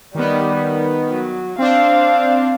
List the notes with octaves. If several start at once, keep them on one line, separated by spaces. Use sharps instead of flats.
D#3 G3 B3
F#3
C4 D4 F5